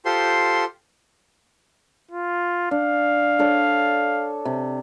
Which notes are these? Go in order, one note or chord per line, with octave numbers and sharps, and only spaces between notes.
F4 G4 A4 C5 C6
F4
D4 F5
D4 A4 C#5
C3